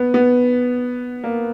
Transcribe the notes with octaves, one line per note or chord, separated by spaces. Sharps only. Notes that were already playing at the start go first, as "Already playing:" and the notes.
Already playing: B3
B3
A#3